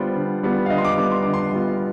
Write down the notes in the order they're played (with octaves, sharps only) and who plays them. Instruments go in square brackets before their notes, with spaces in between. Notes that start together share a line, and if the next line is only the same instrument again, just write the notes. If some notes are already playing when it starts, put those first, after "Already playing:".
Already playing: [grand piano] D3 G3 B3 F4 C5 D5
D3
G3 B3 F4
F5
D3 D#5
C6
D6
G3 B3 F4 D6
C6
D3 D6
C6
G3 B3 F4